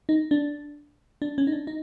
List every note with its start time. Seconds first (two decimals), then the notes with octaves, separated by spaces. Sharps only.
0.09 D#4
0.31 D4
1.22 D4
1.38 C#4
1.47 D#4
1.52 D4
1.67 D#4